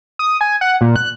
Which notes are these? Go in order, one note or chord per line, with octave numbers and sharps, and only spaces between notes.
D#6
G#5
F#5
A#2
F#6